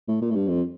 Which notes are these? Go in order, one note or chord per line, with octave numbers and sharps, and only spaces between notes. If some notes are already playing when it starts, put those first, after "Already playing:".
A2
A#2
A2
G2
F2